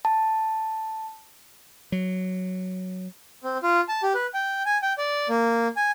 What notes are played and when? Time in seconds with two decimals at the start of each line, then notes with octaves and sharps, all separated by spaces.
0.05 A5
1.92 F#3
3.44 C4
3.63 F4
3.88 A5
4.03 G4
4.14 B4
4.34 G5
4.66 G#5
4.82 G5
4.98 D5
5.29 A#3
5.76 G#5